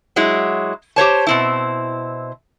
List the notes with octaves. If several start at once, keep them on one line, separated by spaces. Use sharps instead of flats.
F#3 G#3 E4
G4 C5 C#5 A5
B2 C4 E4